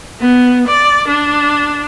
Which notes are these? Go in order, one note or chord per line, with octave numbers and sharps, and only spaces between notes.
B3
D5
D4